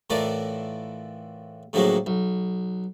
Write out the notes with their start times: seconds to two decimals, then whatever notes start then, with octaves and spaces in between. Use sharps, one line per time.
0.10 A2 E3 F4 A#4 D5 A5
1.73 A2 D3 F3 F#3 G#3 A#3
2.06 B1